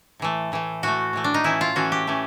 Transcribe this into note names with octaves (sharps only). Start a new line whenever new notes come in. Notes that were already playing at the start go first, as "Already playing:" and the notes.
A2 E3 A3
A2 E3 A3
A2 E3 A3 F#4
A2 E3 A3
D4
D#4
E3 A3 C#4 E4
F4
E3 A3 C#4 F#4
G4
E3 A3 C#4